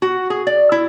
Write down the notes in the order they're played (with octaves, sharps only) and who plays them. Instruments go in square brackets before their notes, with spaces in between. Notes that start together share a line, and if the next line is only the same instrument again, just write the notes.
[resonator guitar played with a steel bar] F#4
G#4
D5
E4